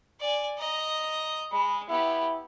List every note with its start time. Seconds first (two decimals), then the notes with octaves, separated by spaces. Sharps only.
0.20 D5 G#5
0.58 D#5 A#5
1.52 G#3 B5
1.89 B3 E4 G4